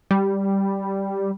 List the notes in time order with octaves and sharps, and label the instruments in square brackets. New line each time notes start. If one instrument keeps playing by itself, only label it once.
[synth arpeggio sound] G3